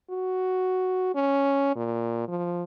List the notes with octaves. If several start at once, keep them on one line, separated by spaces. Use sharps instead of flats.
F#4
C#4
A#2
F3